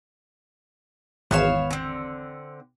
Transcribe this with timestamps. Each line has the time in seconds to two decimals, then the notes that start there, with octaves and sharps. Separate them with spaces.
1.31 G#1 E2 B3 C#5 F5 E7
1.71 D3 C4